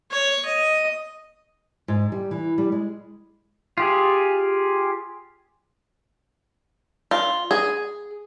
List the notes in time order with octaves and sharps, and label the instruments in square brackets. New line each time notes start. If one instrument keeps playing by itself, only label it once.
[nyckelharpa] C#5
D#5
[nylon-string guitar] G#2
G3
E3
G3
G#3
[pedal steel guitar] F4 G4 G#4
[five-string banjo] F4
G#4